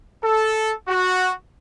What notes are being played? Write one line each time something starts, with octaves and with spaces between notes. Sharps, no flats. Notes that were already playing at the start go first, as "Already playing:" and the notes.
A4
F#4